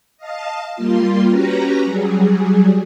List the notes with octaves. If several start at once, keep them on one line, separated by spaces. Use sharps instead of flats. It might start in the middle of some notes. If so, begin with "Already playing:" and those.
D#5 F5 A5
G3 A#3 F4 C6
C#4 F#4 G4 B4 A#5 A#6
F#3 G3 G#4